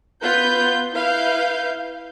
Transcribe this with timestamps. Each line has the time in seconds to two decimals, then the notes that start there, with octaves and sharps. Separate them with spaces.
0.23 B3 F4 B4 G6
0.94 E4 B4 F5 G6